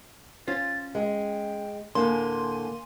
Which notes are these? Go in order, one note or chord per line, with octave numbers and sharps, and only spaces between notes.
C#4 F4 C5 A6
G#3 G5
D2 A2 D3 A#3 G#5 C6